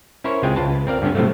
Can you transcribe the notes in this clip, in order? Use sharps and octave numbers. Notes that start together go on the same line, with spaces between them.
C#4 E4 A#4 C5 C#5
C#2 G#3 C4 F4 G5 G#5
C#2 F4 B4 A5
C4 A#4 D5 F5
G2 D3 B3 C#4
A2 C3 F3 F#3 A3